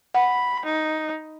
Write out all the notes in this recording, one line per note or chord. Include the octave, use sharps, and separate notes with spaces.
F#5 B5
D#4